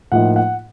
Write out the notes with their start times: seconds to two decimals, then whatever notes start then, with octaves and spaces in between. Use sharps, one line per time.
0.12 A2 F3 A#3 D#4 F#5
0.36 F#5